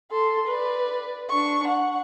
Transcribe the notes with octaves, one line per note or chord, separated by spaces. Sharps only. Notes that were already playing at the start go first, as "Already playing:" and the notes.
A4 C6
B4 D5
D4 C#6
F#5